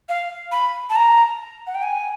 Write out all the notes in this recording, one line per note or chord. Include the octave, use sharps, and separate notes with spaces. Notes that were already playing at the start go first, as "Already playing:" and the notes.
F5
B5
A5
A#5
F#5
G5
G#5